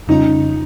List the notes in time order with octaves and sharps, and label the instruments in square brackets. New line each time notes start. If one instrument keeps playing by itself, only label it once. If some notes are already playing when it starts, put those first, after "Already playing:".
[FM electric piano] F2 C#3 G3 C#4 F4 [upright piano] D#4